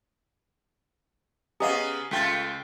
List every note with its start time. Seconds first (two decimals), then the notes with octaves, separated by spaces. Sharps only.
1.60 C#3 B3 G4 D#5 F5 G#5 A#5 D#6
2.11 C#2 A3 F4 G5 A6 B6